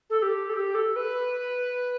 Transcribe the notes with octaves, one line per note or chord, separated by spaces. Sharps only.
A4
G4
A4
G4
A4
B4